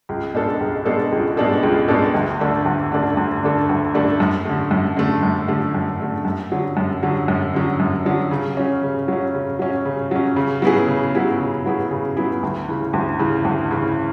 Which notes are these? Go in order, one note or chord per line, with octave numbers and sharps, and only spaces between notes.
C#2
B2 G#3 D4 A4
C#2
B2 G#3 D4 A4
C#2
B2 G#3 D4 A4
C#2
B2 G#3 D4 A4
D2
D3 A3 D4 A4
D2
D3 A3 D4 A4
D2
D3 A3 D4 A4
D2
D3 A3 D4 A4
F#2
D3 A3
F#2
D3 A3
F#2
D3 A3
F#2
D3 A3
F#2
D3 F#3
F#2
D3 F#3
F#2
D3 F#3
F#2
D3 F#3
C#3
F#3 C#4
C#3
F#3 C#4
C#3
F#3 C#4
C#3
F#3 C#4
C#3
F#3 B3 E4 G#4
C#3
F#3 B3 E4 G#4
C#3
F#3 B3 E4 G#4
C#3
F#3 B3 E4 G#4
D2
C#3 E3
D2
C#3 E3
D2
C#3 E3